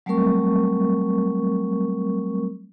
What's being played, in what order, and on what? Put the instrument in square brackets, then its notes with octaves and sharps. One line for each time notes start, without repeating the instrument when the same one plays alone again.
[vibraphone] F#3 G3 A3 C4 A#4 C#6